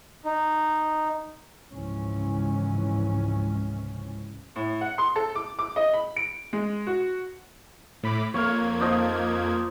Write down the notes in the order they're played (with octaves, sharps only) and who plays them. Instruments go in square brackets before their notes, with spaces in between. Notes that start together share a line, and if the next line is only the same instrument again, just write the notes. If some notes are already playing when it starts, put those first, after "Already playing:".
[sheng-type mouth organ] D#4
[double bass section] C#2 G#2 C3 E3 F3 C#4
[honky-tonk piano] A2
F#5
C6
A4
D6
D6
D#5
B5
D7
G#3
F#4
[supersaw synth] A2 B5 D6
[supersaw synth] F2 A#3 G#6 [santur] C#5 F5
[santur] F3 D#4 D5